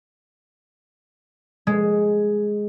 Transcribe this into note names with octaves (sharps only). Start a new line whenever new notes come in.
G#3